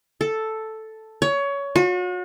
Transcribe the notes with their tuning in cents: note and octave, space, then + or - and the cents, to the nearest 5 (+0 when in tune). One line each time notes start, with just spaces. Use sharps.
A4 +0
C#5 +20
F#4 -40